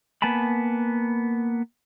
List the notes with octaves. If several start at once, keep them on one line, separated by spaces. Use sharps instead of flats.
A#3 B3 G#5 A5 B5